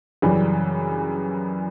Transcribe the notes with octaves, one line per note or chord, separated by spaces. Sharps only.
F#2 C#3 E3 G3